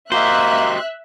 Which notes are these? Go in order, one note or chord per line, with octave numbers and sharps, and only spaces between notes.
A#3 F#4 G4 C5 D#5 E5 F#6